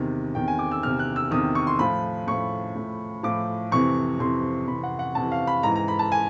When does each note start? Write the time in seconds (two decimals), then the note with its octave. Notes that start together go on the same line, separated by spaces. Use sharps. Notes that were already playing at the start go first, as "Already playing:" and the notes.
Already playing: E2 C3 D#3
0.35 E2 C3 D#3 G5
0.48 G#5
0.59 D6
0.71 E6
0.83 E2 C3 D#3 F6
0.99 F#6
1.16 E6
1.31 E2 C3 D#3 D#6
1.55 C#6
1.67 C6
1.79 A2 F3 B5
2.27 A2 F3 C#6
2.75 A2 F3
3.23 A2 F3 D6
3.72 F2 C3 E3 C#6
4.19 F2 C3 E3 C6
4.67 F2 C3 E3 B5
4.83 F#5
4.99 F#5
5.15 F2 C3 E3 A5
5.32 F5
5.47 B5
5.63 G#2 E3 A#5
5.76 A#5
5.88 B5
5.99 A5
6.12 G#5